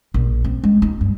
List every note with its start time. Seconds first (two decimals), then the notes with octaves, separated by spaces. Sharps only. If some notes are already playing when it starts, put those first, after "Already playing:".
0.14 A#1
0.45 C4
0.64 G#3
0.82 D#4
1.01 G2